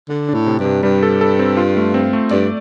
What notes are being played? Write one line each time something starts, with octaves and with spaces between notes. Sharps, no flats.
D3 D4
D4
A2
C3
G2
C3
G2 G3
A4
A4
C4
F4
A3
C4
A3
G2 D5